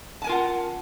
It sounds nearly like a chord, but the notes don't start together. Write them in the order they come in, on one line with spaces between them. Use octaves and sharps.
A5 G#5 A#4 F4 F#5